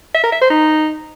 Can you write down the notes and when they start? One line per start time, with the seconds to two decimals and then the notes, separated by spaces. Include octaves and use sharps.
0.14 E5
0.23 A#4
0.32 E5
0.41 C5
0.50 D#4